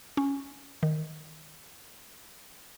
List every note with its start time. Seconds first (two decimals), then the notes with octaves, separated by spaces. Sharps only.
0.17 C#4
0.83 D#3